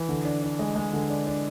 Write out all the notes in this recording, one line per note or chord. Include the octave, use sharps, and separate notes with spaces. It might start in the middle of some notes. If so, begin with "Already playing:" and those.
Already playing: E3
D3
D4
D4
G#3
G#3
D3
D4
D4